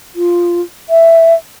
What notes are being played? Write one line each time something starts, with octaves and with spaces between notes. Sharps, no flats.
F4
E5